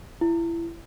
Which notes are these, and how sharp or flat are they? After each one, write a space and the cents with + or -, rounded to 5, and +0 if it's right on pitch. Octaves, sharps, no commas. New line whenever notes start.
E4 +25